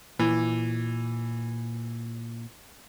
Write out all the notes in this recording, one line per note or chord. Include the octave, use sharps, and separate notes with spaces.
A#2 E3